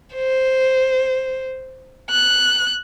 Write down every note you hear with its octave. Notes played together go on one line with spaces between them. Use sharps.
C5
F#6